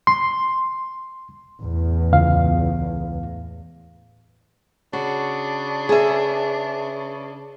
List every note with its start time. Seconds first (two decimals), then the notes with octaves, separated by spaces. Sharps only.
0.07 C6
1.61 E2 A2
2.12 C#2 F5
4.93 C#3 D4 F#4
5.89 G#4 B4 E5